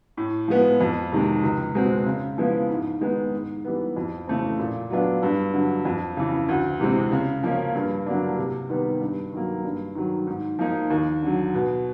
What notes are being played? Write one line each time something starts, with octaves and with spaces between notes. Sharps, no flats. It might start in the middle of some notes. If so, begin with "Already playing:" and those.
A2
F3 G#3 B3
F2
C3 D#3 G#3
C#2
B2 G#3 C4
C#3
F3 G#3 B3 E4
G#2
D#3 G#3 B3 D#4
G#2
E3 G3 B3
F2
C#3 E3 A3 C4
A#2
F#3 B3 D4 F4
G2
D3 F#3
F2
C#3 E3
D2
C3 E3 G#3 C4
C#3
F3 A#3 C#4
G2
D3 F#3 A#3 D4
C3
D#3 G3 B3
G2
D#3 F#3 A#3
G2
D#3 F#3
G#2
F3 A#3 D#4
D#2
D3 F#3
B2